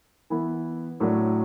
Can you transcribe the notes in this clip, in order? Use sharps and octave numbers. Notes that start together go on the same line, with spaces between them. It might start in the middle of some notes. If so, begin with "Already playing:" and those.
E3 B3 E4
A2 F#3 A3 D4